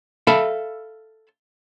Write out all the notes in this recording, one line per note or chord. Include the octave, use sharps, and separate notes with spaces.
A4 E5 F5 A5 B5